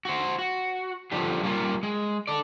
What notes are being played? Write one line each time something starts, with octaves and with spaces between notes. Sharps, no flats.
F#4 C5
F#4
D3 F3 G3 D4 G4
G3 A#3 C#4 F4
G#3
A4 D5